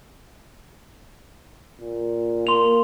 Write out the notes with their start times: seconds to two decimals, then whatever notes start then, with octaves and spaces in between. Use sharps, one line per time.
1.80 A#2
2.47 A#3 C6 F7